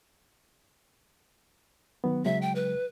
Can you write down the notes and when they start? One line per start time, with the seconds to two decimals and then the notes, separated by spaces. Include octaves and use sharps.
2.04 D#3 F#3 B3
2.25 C#3 F#3 G#3 E5
2.42 G5
2.55 B4